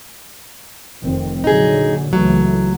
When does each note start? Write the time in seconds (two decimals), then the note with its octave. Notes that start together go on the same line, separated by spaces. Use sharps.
1.03 F1 D#3 C4
1.44 A#2 D3 F#3 D#4 G#4
2.13 C#2 E3 F#3 A3